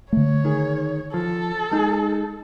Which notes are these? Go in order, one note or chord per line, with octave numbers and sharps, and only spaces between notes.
D3 A3 C#5
D#3 G#4
F3 A4
G#3 D#4 G#4